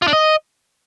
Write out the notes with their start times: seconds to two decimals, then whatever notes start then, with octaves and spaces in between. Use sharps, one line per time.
0.02 F4
0.07 D4
0.13 D#5